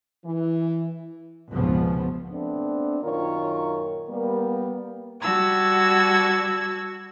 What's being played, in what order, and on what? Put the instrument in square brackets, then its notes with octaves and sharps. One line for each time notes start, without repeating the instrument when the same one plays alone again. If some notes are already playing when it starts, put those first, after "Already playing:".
[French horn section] E3
[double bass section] F1 C#2 G#2 B2 F3 B3
[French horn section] A3 B3 C4 D4
F#2 A#2 D#3 F4 A#4 C#5
G3 A#3 B3
[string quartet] G3 F#4 F#5 A5 E6 G#6